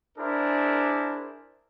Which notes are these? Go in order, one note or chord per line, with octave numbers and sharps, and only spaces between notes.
D4 E4 G#4 A#4 C5